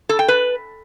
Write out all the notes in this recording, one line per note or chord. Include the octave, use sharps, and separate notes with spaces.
A4
G5
B4